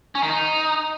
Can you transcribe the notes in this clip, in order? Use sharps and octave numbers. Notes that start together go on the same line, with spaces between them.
C#4
D#3
D#4